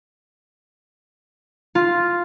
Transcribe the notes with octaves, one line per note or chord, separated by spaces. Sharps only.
F4